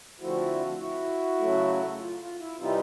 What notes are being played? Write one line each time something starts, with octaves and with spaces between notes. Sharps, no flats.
D3 F3 A3 C4 E4 F#4
E4 F#4
C#3 F#3 A3
F4
F4
E4
C3 E3 G3 C4 D#4 F4